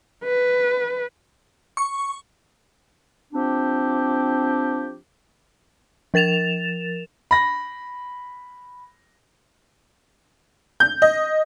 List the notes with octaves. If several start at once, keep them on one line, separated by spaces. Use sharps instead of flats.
B4
C#6
F3 C4 D4 G4
F3 A#4 A6 E7 F7
B5 A#6
G6
D#5